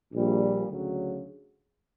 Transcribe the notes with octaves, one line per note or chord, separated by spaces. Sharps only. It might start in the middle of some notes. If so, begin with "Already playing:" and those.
A#1 A#2 G3
D2 C#3 F#3